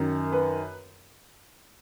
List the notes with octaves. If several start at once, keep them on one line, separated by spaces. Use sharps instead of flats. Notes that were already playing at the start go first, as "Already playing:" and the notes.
Already playing: F#2 D#3
B4